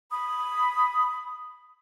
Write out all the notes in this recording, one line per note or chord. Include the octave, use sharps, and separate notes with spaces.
B5 D#6